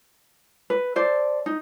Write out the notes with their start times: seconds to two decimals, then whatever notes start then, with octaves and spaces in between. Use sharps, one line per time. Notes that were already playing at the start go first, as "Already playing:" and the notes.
0.70 B4
0.96 A4 C5 D5
1.46 D#4